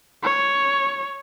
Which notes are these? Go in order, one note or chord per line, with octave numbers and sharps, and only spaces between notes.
C#5